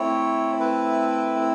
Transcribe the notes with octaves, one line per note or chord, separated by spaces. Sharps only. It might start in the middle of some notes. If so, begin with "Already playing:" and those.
Already playing: A3 C4 E4 C#5
B4